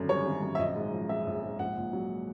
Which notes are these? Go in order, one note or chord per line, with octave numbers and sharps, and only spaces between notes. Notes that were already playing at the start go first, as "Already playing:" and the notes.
Already playing: G#1 F#2 D3
G3 C#5
G#1
F#2
E5
A#1 D#5
G#2
F3
G#3 E5
A#1
G#2
A#1 F#5
A#2
F#3